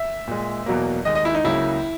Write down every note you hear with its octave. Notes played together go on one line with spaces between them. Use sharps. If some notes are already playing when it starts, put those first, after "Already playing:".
Already playing: E5
A#2 G#3
E2 B2 F#3 A#3
D#2 D#3 G#3 D#5
D#5
E4
D#4
C#2 C#3 F#3 A#3 E4